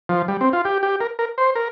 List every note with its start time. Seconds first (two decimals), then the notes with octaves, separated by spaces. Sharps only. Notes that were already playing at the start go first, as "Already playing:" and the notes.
0.09 F3
0.28 G3
0.41 C4
0.53 F4
0.65 G4
0.83 G4
1.01 A#4
1.19 A#4
1.38 C5
1.55 A#4